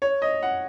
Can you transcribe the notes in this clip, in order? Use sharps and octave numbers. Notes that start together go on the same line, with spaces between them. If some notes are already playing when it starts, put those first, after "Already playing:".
C#5
D#5
F#5